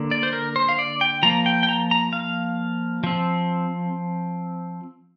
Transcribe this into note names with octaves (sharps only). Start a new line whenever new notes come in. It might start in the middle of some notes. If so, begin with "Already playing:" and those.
Already playing: D3 A#3
D5
C5
A#4
C5
F5
D5
G5
F3 A#3 A#5
G5
G5
A#5
A#5
F5
F3 C4